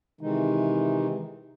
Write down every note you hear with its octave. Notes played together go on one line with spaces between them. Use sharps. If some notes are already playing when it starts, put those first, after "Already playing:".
C3 D#3 E3 G#3 D#4